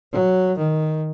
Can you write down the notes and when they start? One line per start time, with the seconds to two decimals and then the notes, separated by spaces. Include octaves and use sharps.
0.13 F#3
0.58 D#3